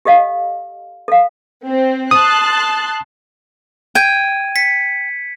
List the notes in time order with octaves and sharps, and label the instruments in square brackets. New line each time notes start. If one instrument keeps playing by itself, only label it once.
[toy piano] G4 A4 D#5 F5
A4 F5
[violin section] C4
[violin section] A5 C6 F#6 [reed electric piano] D#6
[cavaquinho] G5 [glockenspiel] G#6 D#7
[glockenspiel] B6 C#7